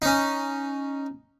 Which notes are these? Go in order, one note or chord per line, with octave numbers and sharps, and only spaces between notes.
C#4 D#4